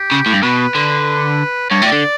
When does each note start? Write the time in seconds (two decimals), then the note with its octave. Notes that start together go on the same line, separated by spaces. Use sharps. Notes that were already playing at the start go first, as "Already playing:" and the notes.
Already playing: G4
0.12 C#3
0.26 A2
0.32 G2
0.42 B2 B4
0.75 D3
1.70 G2 C#5
1.82 A2
1.86 D5
1.92 D3